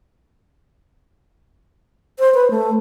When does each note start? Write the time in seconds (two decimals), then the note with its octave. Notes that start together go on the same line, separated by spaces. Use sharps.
2.20 C5
2.34 B4
2.51 A3